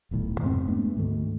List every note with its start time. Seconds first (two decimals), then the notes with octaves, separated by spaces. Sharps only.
0.11 D#1 B1 A2 D#3
0.42 F2 G#2 C3 C4
0.68 G#3 A3 B3 D4
0.97 D2 G#2 D#3 A3